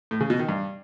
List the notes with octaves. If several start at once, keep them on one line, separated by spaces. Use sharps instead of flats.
A2
C#3
B2
D#3
G2